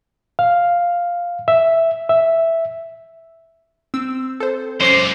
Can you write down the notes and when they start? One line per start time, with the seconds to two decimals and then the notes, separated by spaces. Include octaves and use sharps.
0.39 F5
1.48 E5
2.09 E5
3.94 C4 E6
4.40 A4 C5
4.81 F#2 G#3 C#4 C5 D6 C7